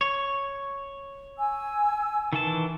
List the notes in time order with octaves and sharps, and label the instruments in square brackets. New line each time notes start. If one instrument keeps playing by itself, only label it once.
[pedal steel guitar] C#5
[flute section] G#5 E6
[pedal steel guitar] D#3 E3 A5